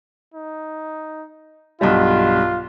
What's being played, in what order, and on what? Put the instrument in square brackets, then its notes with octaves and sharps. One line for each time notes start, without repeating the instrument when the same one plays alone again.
[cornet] D#4
[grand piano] B1 G2 G3 [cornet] F4